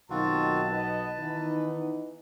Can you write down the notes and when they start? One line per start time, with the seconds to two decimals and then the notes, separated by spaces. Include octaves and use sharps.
0.10 B1 D#3 C4 F4 F#4 A5
0.72 B3 B4 D#5
1.19 D#3 E3 B3 D#4